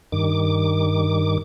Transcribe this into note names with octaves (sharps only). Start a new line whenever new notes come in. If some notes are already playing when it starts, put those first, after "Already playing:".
G2 D#3 D6